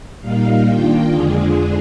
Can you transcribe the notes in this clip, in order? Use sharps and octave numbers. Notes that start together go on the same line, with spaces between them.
A#2 G3 A#3 D#4 F5
D#3 A#3 D4 F4 G5
F2 D3 G#3 D4 F4 G#4